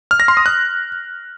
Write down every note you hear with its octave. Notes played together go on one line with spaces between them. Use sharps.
F6
A#6
C6
D#6
F#6